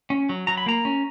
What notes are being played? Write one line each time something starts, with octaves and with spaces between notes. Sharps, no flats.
C#4
F#3
F#3 A#5
B5
A#3 A#5
C#4